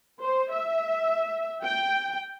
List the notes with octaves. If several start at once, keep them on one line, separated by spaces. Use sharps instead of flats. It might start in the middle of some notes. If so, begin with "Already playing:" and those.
C5
E5
G5